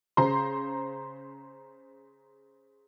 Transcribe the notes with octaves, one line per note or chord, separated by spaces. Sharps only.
C#3 C5 A#5 C6